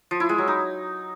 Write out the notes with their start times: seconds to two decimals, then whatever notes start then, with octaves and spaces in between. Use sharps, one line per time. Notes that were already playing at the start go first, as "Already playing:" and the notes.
0.11 F3
0.20 E4
0.29 G#3
0.38 F#3
0.48 D#4